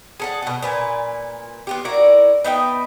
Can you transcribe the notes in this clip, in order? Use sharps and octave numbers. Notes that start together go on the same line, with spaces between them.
G#4 A4 F#5
B2 F#4
A#2 B4 G#5
B3 F4 G4
E4 F#4 A#4 D5
B3 D#4 E5 G5